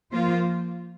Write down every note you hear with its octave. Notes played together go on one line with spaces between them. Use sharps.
F3 A#3 F4 C5